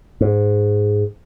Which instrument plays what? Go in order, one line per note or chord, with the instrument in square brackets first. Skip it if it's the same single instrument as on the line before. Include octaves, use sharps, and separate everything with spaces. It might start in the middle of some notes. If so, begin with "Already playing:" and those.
[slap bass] G#2